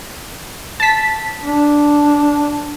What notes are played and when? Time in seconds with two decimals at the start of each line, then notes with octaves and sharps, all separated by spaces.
0.80 A5 B6
1.43 D4